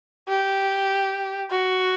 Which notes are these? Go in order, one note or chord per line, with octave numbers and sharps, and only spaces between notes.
G4
F#4